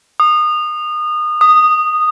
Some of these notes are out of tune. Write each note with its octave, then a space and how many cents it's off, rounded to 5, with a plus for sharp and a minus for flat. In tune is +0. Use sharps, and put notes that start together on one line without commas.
D#6 -25
D#6 -10